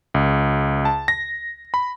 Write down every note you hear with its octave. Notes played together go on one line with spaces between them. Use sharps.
C#2
A5
A#6
B5